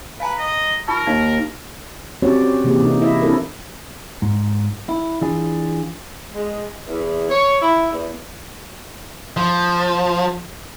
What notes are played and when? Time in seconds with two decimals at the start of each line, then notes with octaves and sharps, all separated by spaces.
0.20 B4 F5 G#5 A#5
0.39 D#5
0.88 D#4 F4 A#4 C#6
1.06 D#2 D#4 F5
2.22 C4 C#4 F#4 G4 C#5 D5
2.64 C3 E3 A#3 G4 G#4
2.83 C3 D#4
3.01 E4 D#5 E5
3.22 C4 D4 E4 A4 A#4
4.22 G#2
4.89 E4
5.21 E3 D4 F4 G#4
6.33 G#3
6.86 E2
7.30 C#5
7.61 E4
7.92 E2
9.37 F3